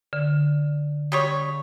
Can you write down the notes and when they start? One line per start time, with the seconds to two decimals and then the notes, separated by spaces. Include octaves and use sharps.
0.13 D3
1.12 C#3 G3 C#5 D#6